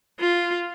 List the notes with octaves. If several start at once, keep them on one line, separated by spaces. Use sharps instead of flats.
F4